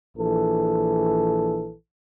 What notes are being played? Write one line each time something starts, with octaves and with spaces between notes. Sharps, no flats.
A#1 E3 A4